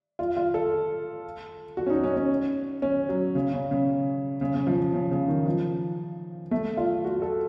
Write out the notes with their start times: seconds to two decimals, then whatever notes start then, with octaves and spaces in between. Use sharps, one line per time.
0.19 F4
0.37 F4
0.54 A4
1.77 F#4
1.86 C#4
1.90 D#4
2.04 C#4
2.17 C#4
2.82 C#4
3.09 F#3
3.35 C#3
3.53 C#3
3.71 C#3
4.41 C#3
4.54 C#3
4.67 F3
4.93 C#3
5.11 C#3
5.28 D#3
5.46 F3
6.51 A3
6.77 F4
7.05 F#4
7.22 A4